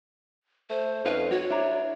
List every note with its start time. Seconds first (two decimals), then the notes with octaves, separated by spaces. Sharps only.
0.70 A3 C5
1.05 F2 C#4 D#4 B4 F5
1.31 F#4 C#5
1.50 D4 E4 A#5